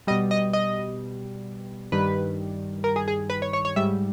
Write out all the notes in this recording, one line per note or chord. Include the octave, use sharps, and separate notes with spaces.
B2 G3 D#5
D#5
D#5
G2 D#3 G3 B4
A#4
G#4
G#4
B4
C#5
C#5
C#5
G#2 G3 E5